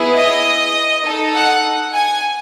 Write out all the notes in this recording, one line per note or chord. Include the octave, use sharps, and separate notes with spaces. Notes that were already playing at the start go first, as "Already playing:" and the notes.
Already playing: B3 E4 G#4
D#5
D#4 A4
F#5
G#5